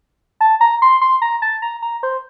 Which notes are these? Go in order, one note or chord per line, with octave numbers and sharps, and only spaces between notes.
A5
A#5
C6
C6
A#5
A5
A#5
A#5
C5